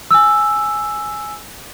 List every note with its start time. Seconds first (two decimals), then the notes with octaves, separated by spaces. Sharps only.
0.11 G#5 E6